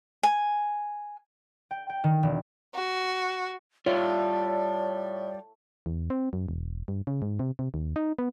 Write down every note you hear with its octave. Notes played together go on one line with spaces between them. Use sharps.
G#5
G5
G5
D#3
E1
F#4
A2 G3 F4 C#5 D5 E5
E2
C4
F#2
E1
G2
C#3
G#2
C3
C3
D#2
D#4
B3